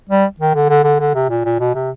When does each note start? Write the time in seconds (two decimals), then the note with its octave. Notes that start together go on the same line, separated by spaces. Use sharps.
0.09 G3
0.40 D#3
0.55 D3
0.69 D3
0.84 D3
1.00 D3
1.15 C3
1.30 A#2
1.45 A#2
1.60 B2
1.75 C3